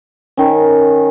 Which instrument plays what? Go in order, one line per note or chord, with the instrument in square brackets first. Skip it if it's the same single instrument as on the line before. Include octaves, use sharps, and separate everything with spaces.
[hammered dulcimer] D#3 C#4